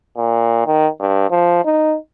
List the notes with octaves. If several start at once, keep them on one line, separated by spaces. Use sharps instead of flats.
A#2
D#3
G2
F3
D#4